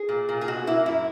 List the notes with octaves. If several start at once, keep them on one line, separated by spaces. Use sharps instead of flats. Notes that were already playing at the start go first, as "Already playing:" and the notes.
Already playing: G#4
A#2
A#2
G#4
B2 F#4
A#3 E4
F#2 E4